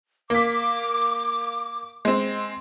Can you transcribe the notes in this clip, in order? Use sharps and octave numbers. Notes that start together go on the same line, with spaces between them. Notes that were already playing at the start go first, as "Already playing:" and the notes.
A#3 D6 B6
G#3 C4